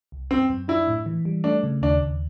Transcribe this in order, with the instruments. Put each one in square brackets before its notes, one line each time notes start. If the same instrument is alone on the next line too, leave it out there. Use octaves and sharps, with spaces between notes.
[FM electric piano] C2
[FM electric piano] F#2 [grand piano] C4
[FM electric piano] F#2
[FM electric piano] D4 [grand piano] E4
[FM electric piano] A2
E3
G3
[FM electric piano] A3 [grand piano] D4
[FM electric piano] C#3
[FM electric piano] D#2 [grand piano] D4
[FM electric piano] D#2